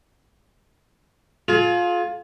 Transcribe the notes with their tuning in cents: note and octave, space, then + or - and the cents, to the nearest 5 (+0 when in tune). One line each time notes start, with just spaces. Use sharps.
F4 +15 G#4 +45